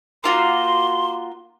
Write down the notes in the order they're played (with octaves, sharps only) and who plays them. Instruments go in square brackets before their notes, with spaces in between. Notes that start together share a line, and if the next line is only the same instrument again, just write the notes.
[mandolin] A#3 F4 F#4 [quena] C6